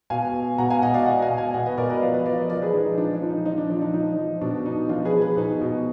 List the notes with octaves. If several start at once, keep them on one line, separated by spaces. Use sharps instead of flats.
B2 F5 G#5
B2
B2 F#5 A#5
F5 G#5
B2 D#5 F#5
D5 F5
B2 D#5 F#5
F5 G#5
B2
F5 G#5
B2 D#5 F#5
B4 D#5
B2 A#4 D5
B4 D#5
F3 D5 F5
B4 D#5
F3 D5 F5
B4 D#5
F3 A#4 D5
G#4 B4
F3 D#4
D#4
F3 D4
D#4
F3
D#4
F3 D#4
D4
F3 D4
D#4
F3 D#4
F3
B2 D4
B2 D#4
F3 D4 F4
G#4 B4
F3
G#4 B4
B2 D#4
B2